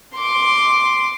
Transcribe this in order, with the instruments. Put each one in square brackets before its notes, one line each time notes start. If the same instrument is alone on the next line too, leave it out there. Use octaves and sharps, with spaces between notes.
[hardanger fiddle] C6 D6